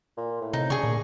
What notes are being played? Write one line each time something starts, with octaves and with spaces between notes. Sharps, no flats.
A#2
A2
C3 D#4
C#3 D4 G#4 C#6
A#2